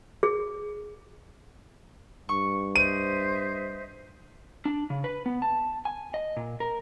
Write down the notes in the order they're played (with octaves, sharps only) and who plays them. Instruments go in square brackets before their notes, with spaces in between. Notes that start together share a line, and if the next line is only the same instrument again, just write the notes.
[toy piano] G#4
[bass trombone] G2 [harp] C#6
[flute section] C5 D#5 E5 [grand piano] D#7
[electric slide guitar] D4
C#3
B4
B3
A5
G#5
D#5
A#2
A#4